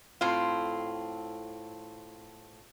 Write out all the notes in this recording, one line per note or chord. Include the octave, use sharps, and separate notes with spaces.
A2 C4 F4